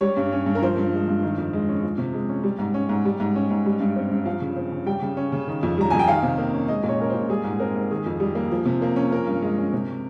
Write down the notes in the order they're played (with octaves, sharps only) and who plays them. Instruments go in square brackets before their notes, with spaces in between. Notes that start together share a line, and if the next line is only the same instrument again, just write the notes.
[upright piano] G3 C#5
G2
C#4
G2
A#4
F3 C5
G2
G#3
G2
D#3
F2
G#3
C#4
F3
C3
G#3
C#4
G3
G#2
C#4
G#2
G3
G#2
C#4
G#2
G3
G2
C4
G2
F3 F5
C#3
C4
C#3
G3 G5
C#3
C#4
C#3
D#3
F2
G3 A#5
F2 G#5
G5
D#3 F5
C3
A#3
C#4
G#3 D#5
A#2
C#5
C#4 A#4
C5
A#2
G3 G#4
G#2
C4 A#4
G#2
D#3 G#4
F2
G3
A#3
F3
C3
A#3
C#4
F3 A#4
G2
G#3
C#4
C3